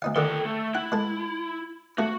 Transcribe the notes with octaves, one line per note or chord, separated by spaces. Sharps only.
D2 D#4 F5
D3 D#3 A4 G5
A3
E4 F#5
G#3 A4
A3 F#4